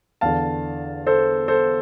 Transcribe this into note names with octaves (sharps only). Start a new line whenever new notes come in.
E2 D3 F5 A5
A4 C5
A4 C5